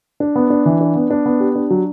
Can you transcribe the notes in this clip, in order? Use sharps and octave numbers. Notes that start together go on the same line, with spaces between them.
D4
B3
D4
E3
D4
B3
D4
B3
G4
D4
F#3